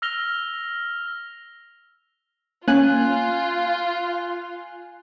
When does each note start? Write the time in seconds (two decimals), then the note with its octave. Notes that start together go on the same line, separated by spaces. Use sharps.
0.02 E6 F6 A#6 F7 G7
2.68 A#3 C#4 F4 G#5 F#6